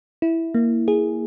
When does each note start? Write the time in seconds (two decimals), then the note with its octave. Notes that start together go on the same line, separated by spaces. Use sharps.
0.22 E4
0.55 A#3
0.88 G#4